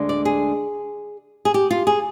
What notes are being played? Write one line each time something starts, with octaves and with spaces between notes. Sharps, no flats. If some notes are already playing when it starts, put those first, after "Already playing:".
Already playing: D2 D3 G#3 D4
D5
G#4
G#4
G4
F4
G#4